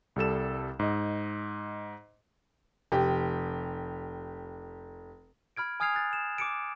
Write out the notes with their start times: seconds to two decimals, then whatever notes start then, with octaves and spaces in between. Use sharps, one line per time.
0.16 C2 G3 A4 E7
0.79 G#2 D#5
2.92 F1 G4
5.57 B5 F6 G#6 D7
5.80 G#5 D#6 F6 G#6 C7 F7
5.94 F6 F#6 A6
6.13 E7
6.38 D6 C#7 D7